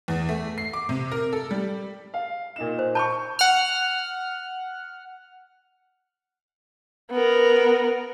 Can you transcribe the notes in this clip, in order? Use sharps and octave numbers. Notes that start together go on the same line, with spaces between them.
E2
A3
C7
D6
C3
A#4
A4
G3
F5
A#2 D#4 E7
C5
A5 B5 C#6 G6
F#5 F6
B3 A#4